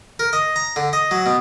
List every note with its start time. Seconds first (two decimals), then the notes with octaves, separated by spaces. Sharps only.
0.19 A#4
0.33 D#5
0.56 A#5
0.76 D3
0.93 D#5
1.11 F#3
1.26 B2